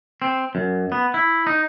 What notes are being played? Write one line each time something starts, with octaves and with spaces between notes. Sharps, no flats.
C4
F#2
B3
E4
D#4